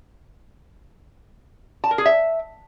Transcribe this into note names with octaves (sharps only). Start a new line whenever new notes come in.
A5
A#4
G#4
E5